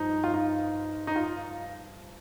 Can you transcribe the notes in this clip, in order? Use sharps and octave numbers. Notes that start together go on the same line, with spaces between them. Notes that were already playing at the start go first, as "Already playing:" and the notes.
Already playing: G2 F3 D#4
F4
D#4
D#4
F4